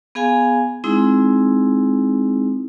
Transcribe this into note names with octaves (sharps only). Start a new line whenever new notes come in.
B3 G#4 F5 G#5
G#3 C4 D#4 E4 G#4